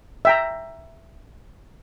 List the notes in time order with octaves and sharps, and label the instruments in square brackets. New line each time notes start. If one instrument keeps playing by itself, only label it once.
[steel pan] E5 G5 A#5